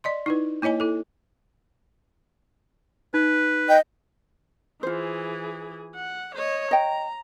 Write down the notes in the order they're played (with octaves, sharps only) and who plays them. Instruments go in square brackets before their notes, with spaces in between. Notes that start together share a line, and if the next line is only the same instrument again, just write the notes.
[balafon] D5 D#5 C6
D#4 E4 B4
A#3 E4 C#5 D#5 G#5
E4 A4
[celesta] D#4 [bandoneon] B4
[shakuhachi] D#5 [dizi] G5
[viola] E3 G#4 [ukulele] F4 C5
[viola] F#5
C#5 D#5
[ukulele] D#5 G5 [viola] A#5